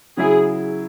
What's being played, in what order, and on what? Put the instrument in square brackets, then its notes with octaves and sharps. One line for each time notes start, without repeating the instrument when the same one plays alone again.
[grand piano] C#3 F#3 E4 [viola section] G#4